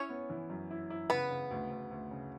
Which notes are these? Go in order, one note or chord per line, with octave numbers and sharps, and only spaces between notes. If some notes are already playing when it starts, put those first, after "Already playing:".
Already playing: C#4 E4 C#5
B3
E3
F#2
E4
E4
C#3 B3 B4
C#3
D2
D2
D2
C#3